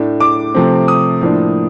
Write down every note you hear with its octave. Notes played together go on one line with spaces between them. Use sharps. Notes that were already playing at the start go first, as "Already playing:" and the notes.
Already playing: A2 A3 D4
D6
C3 F3 A3 C4
D#6
A2 F3 A#3 D4